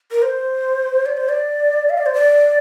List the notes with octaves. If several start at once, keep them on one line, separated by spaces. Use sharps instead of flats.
A#4
C5
D5
C5
D5
F5
D5
C5
D5